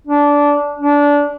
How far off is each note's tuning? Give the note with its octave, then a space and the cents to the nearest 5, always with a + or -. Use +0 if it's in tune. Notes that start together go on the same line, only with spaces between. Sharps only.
D4 -15
D4 -20